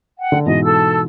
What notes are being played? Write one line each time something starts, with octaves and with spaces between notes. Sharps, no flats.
F#5 G5
D3
G#2 B2 E3 D#5
A4 A5 E6